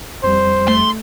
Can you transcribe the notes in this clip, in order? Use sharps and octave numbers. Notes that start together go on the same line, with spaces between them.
F2 G3 C5
A3 C6